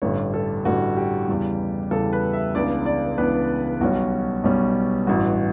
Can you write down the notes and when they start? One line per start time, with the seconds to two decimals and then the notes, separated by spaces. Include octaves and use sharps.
0.02 A1 G2 D3 G3 C#5
0.34 A4
0.65 A1 G2 D3 G3 F#4
0.97 G4
1.28 E2 C#3 G3
1.91 E2 C#3 G3 A4
2.13 B4
2.33 E5
2.55 C#2 C#3 E3 B3 D4 D5
2.86 D5
3.18 C#2 C#3 E3 B3 D4 B4
3.81 B1 B2 G3 C#4 F#4
4.44 B1 B2 G3 C#4
5.07 A1 G2 E3 F#4